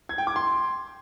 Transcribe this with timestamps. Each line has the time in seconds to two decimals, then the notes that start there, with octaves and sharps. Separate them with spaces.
0.09 G#6
0.18 G5
0.27 D6
0.36 C6